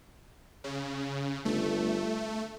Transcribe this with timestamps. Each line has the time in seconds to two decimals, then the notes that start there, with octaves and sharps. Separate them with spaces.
0.64 C#3
1.45 G1 A3